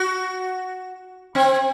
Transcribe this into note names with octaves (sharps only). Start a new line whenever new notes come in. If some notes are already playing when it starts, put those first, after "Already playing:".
Already playing: F#4
C4